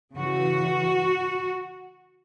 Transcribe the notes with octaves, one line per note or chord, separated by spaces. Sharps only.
C#3 E3 F#4